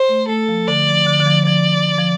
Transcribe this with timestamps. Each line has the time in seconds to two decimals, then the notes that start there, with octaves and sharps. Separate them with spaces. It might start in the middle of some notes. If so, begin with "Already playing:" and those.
Already playing: C5
0.09 A3
0.28 A3 A4
0.49 F3
0.68 D3 D5
0.88 F3
1.06 D3
1.20 D3
1.26 F3
1.47 F3 D5
1.98 F3